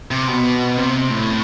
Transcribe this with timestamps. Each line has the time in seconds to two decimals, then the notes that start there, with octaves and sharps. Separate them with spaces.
0.11 C3
0.28 B2
0.77 C3
1.10 A2